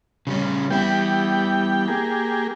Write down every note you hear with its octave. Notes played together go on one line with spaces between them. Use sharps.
C#3 G3 C#4
G3 B3 E4 G5
A#3 G4 G#4